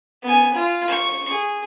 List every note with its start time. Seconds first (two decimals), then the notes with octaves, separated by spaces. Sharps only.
0.23 B3 G#5
0.54 F4
0.87 C#6
1.28 G#4